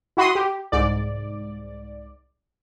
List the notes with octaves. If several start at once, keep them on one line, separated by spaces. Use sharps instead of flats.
E4 F#4 B5 C6 D#6
G4
C2 G#2 D5